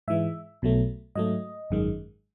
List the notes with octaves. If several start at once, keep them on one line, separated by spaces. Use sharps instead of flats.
G#2 E3 G#3 E5
B1 B2 F#3 A3
G#2 F#3 A3 D#5
G#1 F#2 D#3 G#3